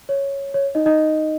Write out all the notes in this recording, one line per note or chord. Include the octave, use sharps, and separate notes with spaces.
C#5
C#5
D#4 D#5
D#4 D#5